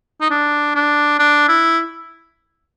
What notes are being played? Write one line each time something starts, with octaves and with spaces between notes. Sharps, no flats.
D#4
D4
D4
D4
E4